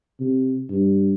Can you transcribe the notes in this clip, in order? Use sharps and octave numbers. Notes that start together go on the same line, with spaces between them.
C3
G2